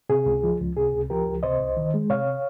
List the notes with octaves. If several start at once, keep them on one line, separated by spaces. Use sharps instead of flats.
C3 G#4
C#2
F3
C#2
C3 G#4
C#2
F3 G4 A#4
C#2
C3 C5 D#5
C2
D#3
G#3
C3 C#5 F5